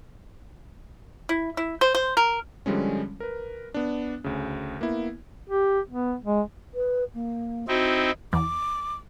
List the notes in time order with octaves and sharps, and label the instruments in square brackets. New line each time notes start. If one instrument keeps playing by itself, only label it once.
[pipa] E4
E4
C5
C5
A#4
[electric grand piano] D3 F3 G3 G#3 C#4
A#4 B4
B3 D4
D2 C#3
A#3 B3 E4
[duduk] G4
B3
G#3
[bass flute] B4
A#3
[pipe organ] C4 D#4 E4 [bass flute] F#4
[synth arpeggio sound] E2 [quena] D6